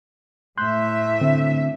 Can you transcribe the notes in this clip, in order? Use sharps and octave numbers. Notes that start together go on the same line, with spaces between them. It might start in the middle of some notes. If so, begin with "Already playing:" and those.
A2 E5 C6 F#6 G6
D3 C4